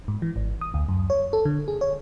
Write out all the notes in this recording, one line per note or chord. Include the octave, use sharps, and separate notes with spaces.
G#2
E3
G#1
D#6
D2
F#2
C#5
A4
D3
G#4
C#5